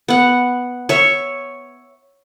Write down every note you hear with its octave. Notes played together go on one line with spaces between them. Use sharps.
B3 F#5
C#5 E5